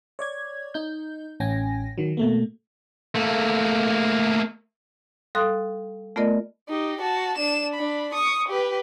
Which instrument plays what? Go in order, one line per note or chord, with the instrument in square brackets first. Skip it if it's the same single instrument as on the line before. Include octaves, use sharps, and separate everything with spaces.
[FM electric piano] C#5 D5 G#6
D#4 G6
A1 C#4 G5 G#5 A#6
D#3 F#3
B2 A3 A#3
[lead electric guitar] A3 A#3
[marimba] G3 A4 F5 C6 D#6 F#6
A3 B3 F4 A#4 D5 D#5
[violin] D#4 G4
F#4 A5
D4 E7
D4 B5
C#6 D#6
G4 B4